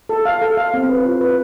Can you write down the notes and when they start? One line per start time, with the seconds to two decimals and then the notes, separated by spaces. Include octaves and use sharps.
0.09 A4
0.26 F5
0.42 A4
0.57 F5
0.74 C4
0.89 B4
1.05 F4
1.21 B4